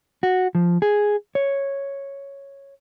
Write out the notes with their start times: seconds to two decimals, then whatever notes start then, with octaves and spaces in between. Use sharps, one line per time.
0.23 F#4
0.55 F3
0.82 G#4
1.35 C#5